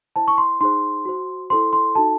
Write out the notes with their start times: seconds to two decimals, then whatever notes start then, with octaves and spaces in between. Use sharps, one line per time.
0.16 E4 C5 A5
0.28 C#6
0.38 C6
0.61 D#4 G#4 C5 C6
1.05 F#4 C5
1.50 E4 A4 C5 C6
1.73 C6
1.95 D#4 F#4 A4 A5